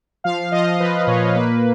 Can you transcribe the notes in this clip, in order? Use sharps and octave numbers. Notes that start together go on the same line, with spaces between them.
F3 F5
F5
F3 D#5
D#5
F3 B4
A#2 C#5
A#3 B4